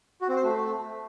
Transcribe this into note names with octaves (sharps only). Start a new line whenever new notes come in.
F#4
C4
C5
A3